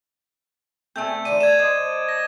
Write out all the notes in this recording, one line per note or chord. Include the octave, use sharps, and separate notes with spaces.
A3 C4 G#5 G6
D#3 C5 D5 D#7
A4 G#6 E7
A3 C5 D5 D#5
A#6